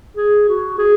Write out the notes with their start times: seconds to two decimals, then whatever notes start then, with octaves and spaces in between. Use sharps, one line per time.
0.17 G#4
0.49 F#4
0.78 G#4